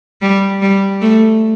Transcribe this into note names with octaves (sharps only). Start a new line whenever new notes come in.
G3
G3
A3